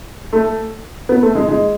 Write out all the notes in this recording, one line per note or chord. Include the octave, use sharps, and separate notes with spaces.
A3
B3
A3
G#3
G#3